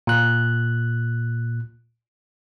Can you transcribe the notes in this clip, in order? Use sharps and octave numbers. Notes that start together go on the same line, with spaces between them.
A#2 F#6